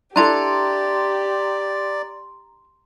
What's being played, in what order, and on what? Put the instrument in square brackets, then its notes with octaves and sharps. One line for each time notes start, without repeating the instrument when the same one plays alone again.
[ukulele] D4 E4 A4 [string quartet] G4 [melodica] D5 [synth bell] A#5 C6